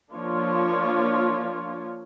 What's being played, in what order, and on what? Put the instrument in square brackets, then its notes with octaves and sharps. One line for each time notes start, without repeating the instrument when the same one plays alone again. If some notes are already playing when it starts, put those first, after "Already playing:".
[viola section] F3 A#3 D4 F4 C#5